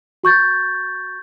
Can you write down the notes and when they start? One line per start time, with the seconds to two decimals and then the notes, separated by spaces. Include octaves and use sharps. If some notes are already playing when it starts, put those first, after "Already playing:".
0.24 F#4 C#6 G6 A6